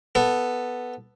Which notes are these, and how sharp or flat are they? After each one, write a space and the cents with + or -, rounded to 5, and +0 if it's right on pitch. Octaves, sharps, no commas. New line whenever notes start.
B3 +0 A4 +0